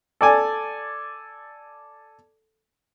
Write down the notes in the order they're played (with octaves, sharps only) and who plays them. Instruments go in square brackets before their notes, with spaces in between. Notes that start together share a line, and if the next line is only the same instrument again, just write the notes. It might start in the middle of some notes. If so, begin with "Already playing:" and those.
[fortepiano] A4 D5 G#5